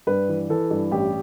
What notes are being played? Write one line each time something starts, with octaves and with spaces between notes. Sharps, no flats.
G2 B4
E3
E3 A4
G2
A1 G4